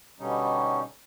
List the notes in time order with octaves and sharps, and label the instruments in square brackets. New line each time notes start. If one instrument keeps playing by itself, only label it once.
[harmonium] B2 D3 G3 C#4 D#4